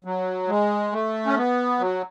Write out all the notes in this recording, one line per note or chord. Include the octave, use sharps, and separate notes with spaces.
F#3
G#3
A3
C#4
B3
F#3